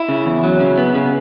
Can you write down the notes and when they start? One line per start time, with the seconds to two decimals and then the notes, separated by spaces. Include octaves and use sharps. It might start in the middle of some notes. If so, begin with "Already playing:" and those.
Already playing: E4
0.09 C#3
0.26 E2
0.43 F#3
0.60 C#3
0.78 B3
0.95 C#3